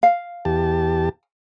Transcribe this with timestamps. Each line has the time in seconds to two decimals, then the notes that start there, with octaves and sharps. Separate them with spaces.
0.03 F5
0.45 E2 G4 A5